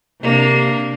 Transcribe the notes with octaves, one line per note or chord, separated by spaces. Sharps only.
C3 A#3 D4